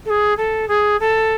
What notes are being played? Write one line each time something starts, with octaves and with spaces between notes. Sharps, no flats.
A4
G#4
A4
G#4
A4